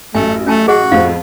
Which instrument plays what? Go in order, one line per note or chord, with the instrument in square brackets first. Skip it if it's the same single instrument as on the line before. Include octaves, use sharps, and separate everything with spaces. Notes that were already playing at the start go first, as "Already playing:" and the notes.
[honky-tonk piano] A1 F#2 [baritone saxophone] A3 [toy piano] G#5
[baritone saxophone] A3 [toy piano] C#4 G#5 A5
[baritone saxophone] F#4 [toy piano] G#4 D#5 F#5
[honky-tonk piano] F2 A2 F3 [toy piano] F5